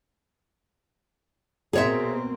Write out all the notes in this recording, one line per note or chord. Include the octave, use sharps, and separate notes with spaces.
B2 A#3 C4 G#4 C#5 E5